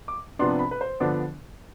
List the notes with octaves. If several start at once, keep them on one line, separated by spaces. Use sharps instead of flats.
D6
C3 F3 B3 D4 C6
B5
B4
C5
D3 F3 B3 D4